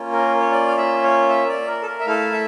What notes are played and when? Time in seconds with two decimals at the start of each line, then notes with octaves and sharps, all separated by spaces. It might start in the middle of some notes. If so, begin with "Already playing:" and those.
Already playing: A#3 C#4 F4
0.12 A#4
0.40 C#5
0.51 D5
0.68 F5
0.77 E5
1.03 C#5
1.28 E5
1.48 D5
1.67 A#4
1.82 A4
1.87 A#4
2.00 E5
2.06 A3 E4 A4 F5
2.32 E5